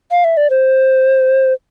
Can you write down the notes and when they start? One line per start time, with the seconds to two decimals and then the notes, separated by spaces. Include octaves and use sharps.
0.11 F5
0.24 E5
0.37 D5
0.50 C5